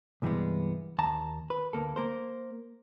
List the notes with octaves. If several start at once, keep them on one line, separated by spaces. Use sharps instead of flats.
C2 G2 E3 G3 G#3 B3
D#2 A5 A#5
B4
D2 A#3 A4
A#3 A#4 C5